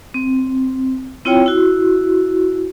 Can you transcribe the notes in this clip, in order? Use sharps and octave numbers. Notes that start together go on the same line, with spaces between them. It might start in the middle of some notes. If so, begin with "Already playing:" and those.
C4
C4 E4 F4 C#5 G5
E4 F#4